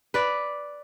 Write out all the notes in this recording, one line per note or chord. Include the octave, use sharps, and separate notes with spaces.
B4 D5